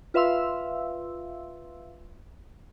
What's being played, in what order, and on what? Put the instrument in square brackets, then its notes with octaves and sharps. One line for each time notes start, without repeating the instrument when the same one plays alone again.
[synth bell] F4 B4 E5 F5 C6 E6